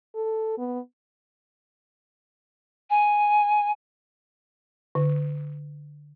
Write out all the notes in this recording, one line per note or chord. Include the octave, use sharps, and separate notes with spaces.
A4
B3
G#5
D3